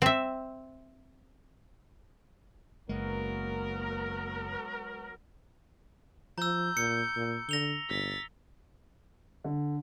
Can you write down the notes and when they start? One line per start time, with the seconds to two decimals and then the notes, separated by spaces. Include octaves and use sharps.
0.02 C4 E5
2.89 F#1 F#3 G#3 A#3 B3 A#4
6.38 F3 A#5 E6 G6
6.77 A#2 C#7
7.16 A#2
7.49 D3 A#6 F7 G7
7.89 G1 A6 B6
9.44 D3